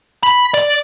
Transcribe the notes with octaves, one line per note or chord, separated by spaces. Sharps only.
B5
D5